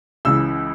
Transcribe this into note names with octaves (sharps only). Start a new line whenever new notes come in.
C#2 C#3 E3 E6